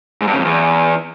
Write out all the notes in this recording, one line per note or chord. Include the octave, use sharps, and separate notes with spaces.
G#2
G2
C#3
F2
E2